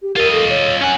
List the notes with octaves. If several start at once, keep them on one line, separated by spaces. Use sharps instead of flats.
G4
F4 A#4 D#5
A4
C#5
C#4 F#5 G#5